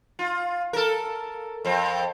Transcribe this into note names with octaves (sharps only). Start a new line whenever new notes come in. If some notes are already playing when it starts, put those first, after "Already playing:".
F4
A4 A#4
F2 C4